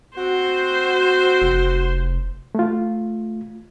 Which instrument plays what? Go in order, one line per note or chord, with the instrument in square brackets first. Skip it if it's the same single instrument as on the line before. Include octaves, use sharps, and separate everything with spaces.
[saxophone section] C4 F#4 [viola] C5
[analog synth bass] F1
[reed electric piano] A3 F4